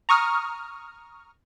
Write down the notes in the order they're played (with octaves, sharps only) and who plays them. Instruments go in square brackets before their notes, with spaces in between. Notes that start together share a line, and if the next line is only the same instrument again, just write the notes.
[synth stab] A#5 C#6 D#6 F6